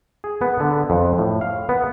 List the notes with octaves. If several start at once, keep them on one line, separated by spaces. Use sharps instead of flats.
G#4
B3
D3
F2
A2
F5
B3